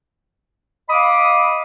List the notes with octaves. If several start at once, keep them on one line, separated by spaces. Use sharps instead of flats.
D#5 F5 B5 D6 D#6